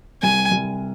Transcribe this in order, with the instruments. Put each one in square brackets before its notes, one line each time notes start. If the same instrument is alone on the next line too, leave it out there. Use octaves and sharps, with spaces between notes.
[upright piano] C2 [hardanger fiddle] G#5
[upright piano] C2